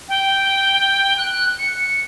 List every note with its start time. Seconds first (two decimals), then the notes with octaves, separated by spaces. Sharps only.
0.09 G5
1.18 F#6
1.59 C#7